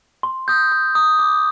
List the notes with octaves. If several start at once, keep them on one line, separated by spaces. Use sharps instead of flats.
C6
D#6 G6
C6
D#6 G6
D6